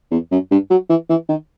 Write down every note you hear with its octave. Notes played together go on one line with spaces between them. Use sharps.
E2
F#2
G2
F#3
E3
E3
D#3